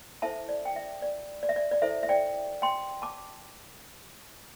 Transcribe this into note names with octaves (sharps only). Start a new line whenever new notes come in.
E4 A4 C5 E5 A5
D5
G5
E5
D5
D5
E5
D5
D5
E4 A4 C5 E5
E5
D5 G5
G5 C6
A5 D6